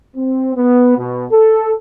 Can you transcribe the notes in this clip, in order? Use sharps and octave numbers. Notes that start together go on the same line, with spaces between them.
C4
B3
B2
A4